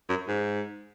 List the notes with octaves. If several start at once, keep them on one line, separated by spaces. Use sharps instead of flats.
F#2
G#2